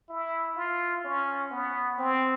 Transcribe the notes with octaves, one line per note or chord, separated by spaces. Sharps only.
E4
F4
C#4
B3
C4